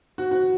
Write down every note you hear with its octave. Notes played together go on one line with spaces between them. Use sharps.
F#4
F#4